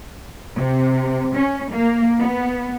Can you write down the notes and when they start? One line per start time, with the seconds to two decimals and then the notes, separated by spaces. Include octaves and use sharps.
0.57 C3
1.35 C#4
1.72 A#3
2.19 B3